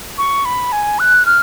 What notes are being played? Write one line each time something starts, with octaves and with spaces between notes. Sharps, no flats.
C#6
B5
G#5
F#6
F6